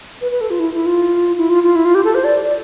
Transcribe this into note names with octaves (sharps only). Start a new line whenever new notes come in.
B4
B4
A4
F4
E4
E4
F4
E4
F4
F4
E4
F4
G4
A4
C5
D5
D5